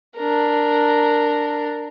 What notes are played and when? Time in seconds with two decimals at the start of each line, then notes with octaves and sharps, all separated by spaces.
0.17 D4 A#4